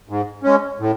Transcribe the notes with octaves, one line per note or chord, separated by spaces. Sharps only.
G#2
G#3 C#4
A2